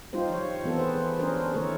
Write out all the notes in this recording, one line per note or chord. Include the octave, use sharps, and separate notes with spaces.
G3 D#4 F4 G4 C5
F3 C#5
E3 B3 C4 A4
G#4 B4 C5
C#4 D4 G#4 A#4 C5
D#3 A3 A4 A#4 C#5